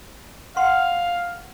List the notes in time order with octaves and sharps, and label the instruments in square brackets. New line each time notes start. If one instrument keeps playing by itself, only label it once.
[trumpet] F5 [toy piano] F#5 C6